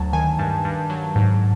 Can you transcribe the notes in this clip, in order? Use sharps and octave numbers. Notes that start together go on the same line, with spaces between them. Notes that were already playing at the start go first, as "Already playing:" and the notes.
Already playing: D2 F#3 A5
D#3 G#5
G2 A5
G2
F#3
G#2